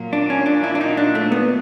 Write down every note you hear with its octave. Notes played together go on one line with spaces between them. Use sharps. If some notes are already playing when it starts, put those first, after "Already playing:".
Already playing: A#2 F#3 A#3
D4
C#4
D4
E4
D4
D#4
D4
A3
B3